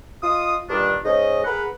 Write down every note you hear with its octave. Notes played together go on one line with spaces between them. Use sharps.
F4 D#5 D#6
G2 A#2 D#3 D4
G#2 C#4 D#5
G#4 A#4 B4 F#5